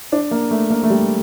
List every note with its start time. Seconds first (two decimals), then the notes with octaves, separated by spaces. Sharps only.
0.12 D4
0.31 A#3
0.51 A3
0.70 A#3
0.83 A3
0.90 G3